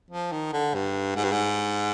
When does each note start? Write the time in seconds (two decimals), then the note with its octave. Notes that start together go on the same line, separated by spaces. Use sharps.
0.11 F3
0.32 D#3
0.53 D3
0.75 G2
1.16 G#2
1.24 G2
1.32 G#2